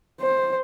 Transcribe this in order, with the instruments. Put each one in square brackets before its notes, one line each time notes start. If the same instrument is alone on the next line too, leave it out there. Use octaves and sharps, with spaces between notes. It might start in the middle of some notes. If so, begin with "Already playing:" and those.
[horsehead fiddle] C5